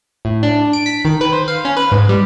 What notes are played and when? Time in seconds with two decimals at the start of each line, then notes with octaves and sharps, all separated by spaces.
0.25 A2
0.43 D4
0.73 D7
0.86 B6
1.05 D#3
1.21 B4
1.32 C5
1.48 F5
1.65 C#4
1.77 B4
1.92 G#2
2.09 G3